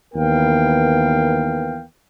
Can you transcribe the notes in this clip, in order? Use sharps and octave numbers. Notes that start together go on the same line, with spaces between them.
D#2 E3 B3 A#4 F5 G5